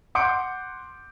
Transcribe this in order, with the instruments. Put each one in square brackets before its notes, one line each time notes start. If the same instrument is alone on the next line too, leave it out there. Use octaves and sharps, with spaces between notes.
[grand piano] F#5 C6 D6 G6 C#7 D7